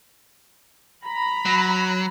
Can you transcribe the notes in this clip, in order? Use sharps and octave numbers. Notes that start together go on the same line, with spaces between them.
A#5 B5
F#3